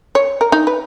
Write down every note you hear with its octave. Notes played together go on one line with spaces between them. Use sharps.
C#5
A#4
D#4
B4